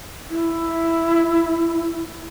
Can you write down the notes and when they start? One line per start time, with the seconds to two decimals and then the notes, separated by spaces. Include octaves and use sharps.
0.30 E4